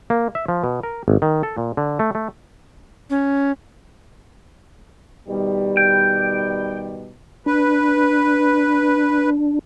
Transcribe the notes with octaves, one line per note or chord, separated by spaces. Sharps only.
A#3
E5
F3
B2
A#4
G#1
D#3
A4
A#2
D3
A3
A3
C#4
B2 D#3 G3
G5
D4 B4